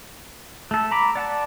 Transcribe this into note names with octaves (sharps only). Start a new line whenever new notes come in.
A3 A4
A#5 B5 D6
D5 F#5 A5